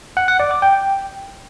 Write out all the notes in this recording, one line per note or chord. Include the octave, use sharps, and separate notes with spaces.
F#5
F#5
D5
D6
G5